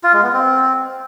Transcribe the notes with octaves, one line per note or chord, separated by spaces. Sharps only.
F4
G#3
B3
C4